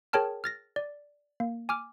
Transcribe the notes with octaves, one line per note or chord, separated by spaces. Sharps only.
G#4 A#4 C#5 G5 A5 F6
F6 A6 A#6
D5
A#3
G#5 D6 F6